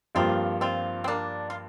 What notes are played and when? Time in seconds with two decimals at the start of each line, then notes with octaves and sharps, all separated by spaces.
0.15 G2 F3 A#3 C4 F4 G4
0.61 C4 F4
1.04 C4
1.08 A#3 D4
1.50 F4